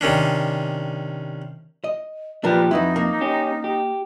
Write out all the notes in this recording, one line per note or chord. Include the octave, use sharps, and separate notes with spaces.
C3 D#3 C#4 D4
D#5
A#2 F3 D4 G4 A#4 B4
F2 D#4 E4 F#4 B4
A#3
C#4 G4
G4